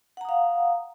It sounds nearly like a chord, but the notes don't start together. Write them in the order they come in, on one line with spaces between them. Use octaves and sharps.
F#5 A#5 D#6 F5